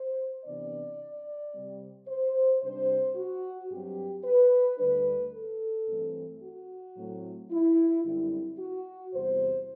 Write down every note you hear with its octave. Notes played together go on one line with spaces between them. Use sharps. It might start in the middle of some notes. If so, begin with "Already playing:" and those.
Already playing: C5
C3 E3 B3 D4 D5
C3 G3 C4
C5
C3 G3 D4 C5
F#4
G2 F#3 C4 G4
B4
D2 D3 G3 D4 B4
A4
G2 E3 A3 C4
F#4
A2 F#3 A3 C4
E4
F#2 D3 G3 C4 E4
F#4
E2 C3 G3 C5